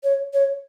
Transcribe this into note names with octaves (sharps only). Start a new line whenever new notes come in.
C#5
C#5